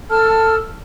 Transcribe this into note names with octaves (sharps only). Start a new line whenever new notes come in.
A4 A5 E6 F6